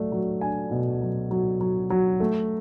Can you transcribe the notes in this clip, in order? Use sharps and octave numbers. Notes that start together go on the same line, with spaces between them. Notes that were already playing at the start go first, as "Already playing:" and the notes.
Already playing: F#3 A3 D4
F#3
D4 G#5
B2
F#3
F#3
F#3
F#3
A3